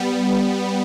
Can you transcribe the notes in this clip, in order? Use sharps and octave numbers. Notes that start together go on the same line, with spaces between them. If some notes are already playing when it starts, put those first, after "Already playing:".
Already playing: G3 B3